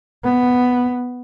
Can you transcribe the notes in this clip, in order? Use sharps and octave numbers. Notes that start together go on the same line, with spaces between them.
B3